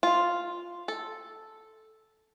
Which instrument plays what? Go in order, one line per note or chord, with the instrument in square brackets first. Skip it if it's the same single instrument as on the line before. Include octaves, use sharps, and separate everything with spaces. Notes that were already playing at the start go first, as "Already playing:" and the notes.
[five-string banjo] F4
A4